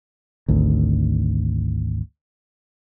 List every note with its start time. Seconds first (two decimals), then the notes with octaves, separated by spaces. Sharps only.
0.48 G#1 D2